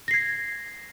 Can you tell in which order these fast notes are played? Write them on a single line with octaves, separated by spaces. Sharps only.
A#6 C7 G#6